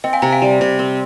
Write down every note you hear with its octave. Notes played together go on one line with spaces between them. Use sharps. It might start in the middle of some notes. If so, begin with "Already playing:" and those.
C4 D#5 G5
F5 G#5
C3 G5 A#5
F5 G#5
G3
C3
C4